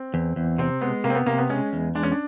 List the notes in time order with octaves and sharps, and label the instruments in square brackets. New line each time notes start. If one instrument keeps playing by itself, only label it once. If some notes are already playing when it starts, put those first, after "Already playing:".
Already playing: [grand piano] C4
[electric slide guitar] E2
E2
[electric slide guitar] C3 [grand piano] C4
[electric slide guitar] G#3 [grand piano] B3
[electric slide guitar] C3 [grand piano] A#3
[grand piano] C4
B3
[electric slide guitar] C3 [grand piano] A#3
[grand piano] B3
[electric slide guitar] G#3 [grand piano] C#4
[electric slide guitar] E2
[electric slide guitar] G#3 [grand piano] D4
[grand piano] C#4
D4